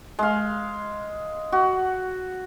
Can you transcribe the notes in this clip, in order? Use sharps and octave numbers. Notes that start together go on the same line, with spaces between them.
G#3 F5
F#4